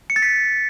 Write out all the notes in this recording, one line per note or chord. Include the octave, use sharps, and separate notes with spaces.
C#7
A6
B6